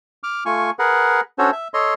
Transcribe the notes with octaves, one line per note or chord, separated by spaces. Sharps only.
D6 F6
A3 F4 G#5 C#6
G#4 A#4 B4 F#5
C#4 D4 F#4 A4 C5 C#5
E5
A4 C#5 D#5 C6